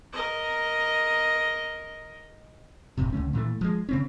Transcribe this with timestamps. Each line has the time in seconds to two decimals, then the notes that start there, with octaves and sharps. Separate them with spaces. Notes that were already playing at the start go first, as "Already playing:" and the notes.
0.13 A#4 D#5
2.97 E1 A1 C3
3.13 C#2 D3 A3 C#4
3.33 A#2 E3 F3 A3
3.61 F3 G#3
3.89 C#3 C4 C#4